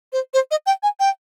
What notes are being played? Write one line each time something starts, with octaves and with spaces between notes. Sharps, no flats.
C5
C5
D#5
G5
G#5
G5